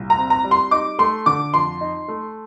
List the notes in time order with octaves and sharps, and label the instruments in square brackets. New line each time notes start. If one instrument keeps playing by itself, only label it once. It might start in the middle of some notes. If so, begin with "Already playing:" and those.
Already playing: [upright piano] C2 A#2
A#5
C4
A#5
G3
C6
D#4 D6
A3 C6
D3 D6
F2 C6
D#4
A3